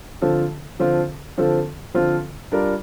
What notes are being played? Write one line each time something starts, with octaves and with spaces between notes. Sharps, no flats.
D3 F3 C4 F4 A4
D3 F3 C4 F4 A4
D3 F3 C4 F4 A4
D3 F3 C4 F4 A4
G3 D4 F4 A#4 D5